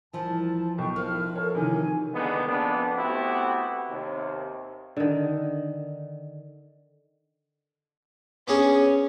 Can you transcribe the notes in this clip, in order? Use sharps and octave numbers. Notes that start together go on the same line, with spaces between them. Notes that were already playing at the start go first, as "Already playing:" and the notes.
C2 E3 F3 A#4 A5
B1 G5 C#6
F3 E4 A#4 F6
A4 C#5
C3 D#3 E3 G#4 C#5 G#5
D3 D#3 G#3 A#3 B3
F2 A#3 B3 D4
A3 B3 C4 E4 F#4 G4
D#2 C3
D3 D#3
B3 C#4 D4 G#4